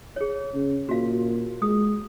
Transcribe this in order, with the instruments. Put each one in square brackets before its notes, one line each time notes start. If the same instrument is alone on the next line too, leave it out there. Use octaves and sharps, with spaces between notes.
[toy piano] G#4 C#5
[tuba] C#3
[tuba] A#2 [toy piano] F#4 F5
[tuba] G#3 [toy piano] D#6